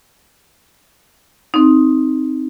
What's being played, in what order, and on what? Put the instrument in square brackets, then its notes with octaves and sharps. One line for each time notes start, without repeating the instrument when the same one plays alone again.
[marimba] C4 D#4